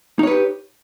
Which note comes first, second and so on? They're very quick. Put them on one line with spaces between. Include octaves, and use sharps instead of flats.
D#4 C#5 B4 G4